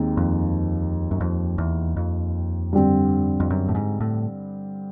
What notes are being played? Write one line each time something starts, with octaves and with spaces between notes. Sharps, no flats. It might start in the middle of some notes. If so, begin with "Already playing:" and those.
Already playing: D#2 D#3 G#3 C4
F2
F#2
F2
E2
F2
G2 D3 G3 C4
F2
F#2
A2
G#2
A2